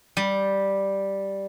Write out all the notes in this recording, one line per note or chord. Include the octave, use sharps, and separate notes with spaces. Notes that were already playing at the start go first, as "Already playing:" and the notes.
G3